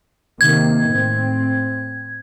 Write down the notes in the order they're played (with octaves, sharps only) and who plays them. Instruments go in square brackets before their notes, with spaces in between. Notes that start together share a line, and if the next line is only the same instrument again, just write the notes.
[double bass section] C3 D#3 A#3 [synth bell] G#6
[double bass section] A2 C4